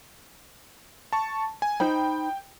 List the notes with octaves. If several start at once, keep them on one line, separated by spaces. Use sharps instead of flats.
A5 C#6
G#5
D#4 C5 G5 B5